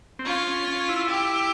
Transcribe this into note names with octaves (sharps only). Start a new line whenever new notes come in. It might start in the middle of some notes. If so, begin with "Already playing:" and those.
C4
C#4 F4
C#4
C#4
E4
G4